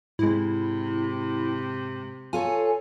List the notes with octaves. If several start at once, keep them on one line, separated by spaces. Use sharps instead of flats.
G#2 C3 G#3 E4
F4 A4 C#5 G#5